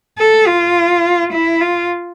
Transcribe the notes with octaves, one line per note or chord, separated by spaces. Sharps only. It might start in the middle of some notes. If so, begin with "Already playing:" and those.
A4
F4
E4
F4